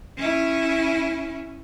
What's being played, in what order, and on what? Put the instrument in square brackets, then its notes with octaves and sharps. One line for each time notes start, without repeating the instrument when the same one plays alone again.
[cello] C#4 E4